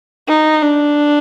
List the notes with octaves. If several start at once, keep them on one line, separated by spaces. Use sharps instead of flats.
D#4
D4